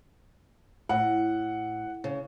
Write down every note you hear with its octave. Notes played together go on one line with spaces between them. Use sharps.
A2 F#5
C#3